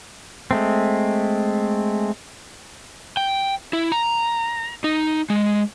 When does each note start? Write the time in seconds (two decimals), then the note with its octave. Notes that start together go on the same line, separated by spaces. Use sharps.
0.51 G#3 A3 C4
3.17 G5
3.73 E4
3.92 A#5
4.84 D#4
5.30 G#3